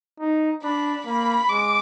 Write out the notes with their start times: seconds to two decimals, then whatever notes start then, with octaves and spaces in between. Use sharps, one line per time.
0.20 D#4
0.63 D4 B5
1.06 A#3 B5
1.49 G#3 D6